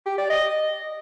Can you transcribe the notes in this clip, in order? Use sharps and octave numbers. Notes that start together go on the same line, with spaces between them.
G4
D5
D#5